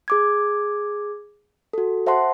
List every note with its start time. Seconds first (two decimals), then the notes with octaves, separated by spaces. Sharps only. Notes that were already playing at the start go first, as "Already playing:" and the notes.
0.08 G#4 D6 G#6
1.73 F#4 A4
2.06 C5 E5 F#5 A5 C6